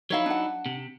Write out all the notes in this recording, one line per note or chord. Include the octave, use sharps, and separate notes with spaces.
F#3 D#4 E4 C#5 E5 F5
D4 F#5
C3